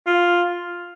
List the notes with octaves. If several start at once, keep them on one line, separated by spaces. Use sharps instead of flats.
F4